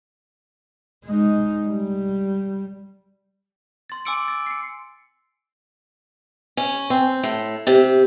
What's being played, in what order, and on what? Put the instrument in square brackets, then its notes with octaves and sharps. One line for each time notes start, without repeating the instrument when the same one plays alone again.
[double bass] G#3 D#4
G3
[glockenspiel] C6 A6
G#5 C6 D6 E6 C#7 D7
A6
C7 C#7
[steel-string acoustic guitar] C#4
C4
A2
C3